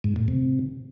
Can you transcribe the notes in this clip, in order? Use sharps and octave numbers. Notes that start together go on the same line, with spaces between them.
G#2
A2
C3